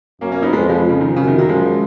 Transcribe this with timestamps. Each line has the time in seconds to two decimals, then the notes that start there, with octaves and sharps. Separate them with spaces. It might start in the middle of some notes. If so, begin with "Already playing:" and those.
0.21 F#2 A#3 C#4
0.32 A#3 C#4
0.42 B3 D#4
0.53 F2 G#3 B3
0.69 F3 G#3
0.89 C#3
1.01 D#3
1.16 F#2 C#3
1.27 D#3
1.38 D#3 F#3
1.49 F3 G#3